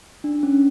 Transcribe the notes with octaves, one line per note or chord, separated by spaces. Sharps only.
D4
C#4